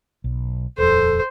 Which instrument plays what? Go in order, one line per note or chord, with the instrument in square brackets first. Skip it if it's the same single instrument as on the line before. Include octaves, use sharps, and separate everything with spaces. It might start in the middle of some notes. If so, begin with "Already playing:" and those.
[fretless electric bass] B1
[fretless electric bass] D#1 F2 [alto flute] A4 [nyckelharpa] C5